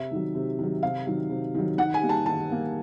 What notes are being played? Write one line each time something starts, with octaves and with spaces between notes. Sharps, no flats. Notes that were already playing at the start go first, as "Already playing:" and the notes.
Already playing: C3 E5
D#3 F#3
C3
D#3 F#3
C3 F5
D#3 F#3
C3
D#3 F#3
D#3 F#5
G#5
G3 A#3
A5
D#3 A5
G3 A#3